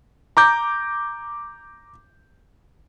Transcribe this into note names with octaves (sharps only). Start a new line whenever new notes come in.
A#5 D6 G6